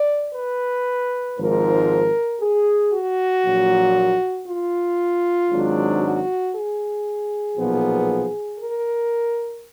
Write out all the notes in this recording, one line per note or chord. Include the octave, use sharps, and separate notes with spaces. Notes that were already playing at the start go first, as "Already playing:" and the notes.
Already playing: D5
B4
G#1 G#2 F3 A#4
G#4
F#4
A#1 A#2 F#3
F4
G#1 G#2 F#3 D4
F#4
G#4
B1 A#2 F3 B3
A#4